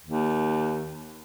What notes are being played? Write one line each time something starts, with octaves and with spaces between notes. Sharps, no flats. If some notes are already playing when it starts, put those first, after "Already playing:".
D#2